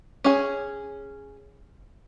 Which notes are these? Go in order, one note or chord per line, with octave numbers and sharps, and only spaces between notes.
C#4 G#4